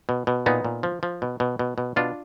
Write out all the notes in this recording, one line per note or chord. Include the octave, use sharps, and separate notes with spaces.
B2
B2
A#2 B3 D#4
A#2
F3
F3
B2
B2
B2
B2
B2 D4 F4